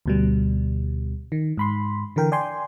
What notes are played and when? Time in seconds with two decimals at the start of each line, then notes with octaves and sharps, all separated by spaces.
0.06 D2 B2 G3
1.32 D#3
1.57 G#2 B5 C6
2.16 D3 E3 A#4 G5
2.32 D5 G5 G#5 C6